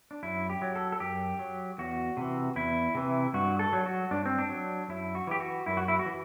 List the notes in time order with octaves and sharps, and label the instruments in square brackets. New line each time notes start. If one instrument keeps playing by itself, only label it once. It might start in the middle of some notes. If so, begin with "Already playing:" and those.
[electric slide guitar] D4
F#2 E4
G4
F#3
A4
A4
F#2 G4
F#3
E2 F#4
C3 E3
E2 E4
C3 E3
G2 F#4
A4
F#3
F#4
G2 D4
C4
D4
F#3
F#2 E4
F#4
E3 G4
F#4
F#2 E4
F#4
E4
F#4
E3